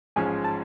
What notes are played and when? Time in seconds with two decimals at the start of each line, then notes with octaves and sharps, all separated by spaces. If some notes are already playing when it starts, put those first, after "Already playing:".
0.16 A1 G#2 F3 G#3 C#4 G#5
0.44 A5